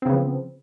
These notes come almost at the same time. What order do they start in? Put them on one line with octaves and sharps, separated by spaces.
C4 C#3 B3 F3